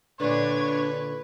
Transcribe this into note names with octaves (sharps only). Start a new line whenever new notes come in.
A#2 D3 D4 B4 C#5